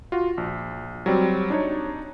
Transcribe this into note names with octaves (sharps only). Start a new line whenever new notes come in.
F4 F#4
A#1
F#3 G3 C4
D4 D#4 C#5